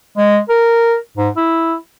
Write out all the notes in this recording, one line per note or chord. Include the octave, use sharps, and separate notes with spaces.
G#3
A#4
G#2
E4